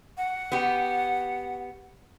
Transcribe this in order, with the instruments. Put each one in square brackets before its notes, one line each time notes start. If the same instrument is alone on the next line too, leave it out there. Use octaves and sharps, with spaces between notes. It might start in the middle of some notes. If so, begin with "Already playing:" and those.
[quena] F#5
[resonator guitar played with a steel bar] B3 G4